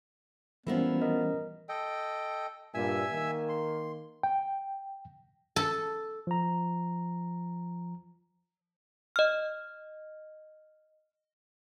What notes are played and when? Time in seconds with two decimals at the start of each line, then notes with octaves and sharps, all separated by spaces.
0.67 E3 F3 G3 A#3 B3 C#4 E4
1.01 A#4 D#5
1.69 A4 D#5 G5
2.74 G2 A#2 E5 G#5 E6
3.11 D#3 A#3
3.49 C6
4.23 G5
5.56 A4
6.27 F3 A#5
9.16 D#5 F6